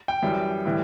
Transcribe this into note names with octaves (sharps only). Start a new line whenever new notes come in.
G5
F#2 E3 G3
A2 E3 G3